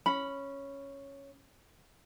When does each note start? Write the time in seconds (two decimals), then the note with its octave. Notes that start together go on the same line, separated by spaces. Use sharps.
0.06 C#4 B5